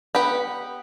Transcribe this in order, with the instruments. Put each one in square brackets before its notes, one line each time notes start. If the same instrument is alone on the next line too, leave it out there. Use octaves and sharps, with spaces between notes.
[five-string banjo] B3 G4 B4